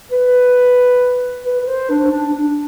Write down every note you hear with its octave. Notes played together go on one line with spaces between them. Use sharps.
B4
B4
B4
C5
D4
D4
D4